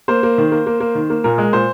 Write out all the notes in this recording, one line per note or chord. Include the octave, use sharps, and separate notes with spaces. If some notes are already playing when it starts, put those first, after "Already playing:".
A#3 C5
A#3
D#3
A#3
A#3
A#3
D#3
A#3
A#2 A#4
G#3
A#2 C5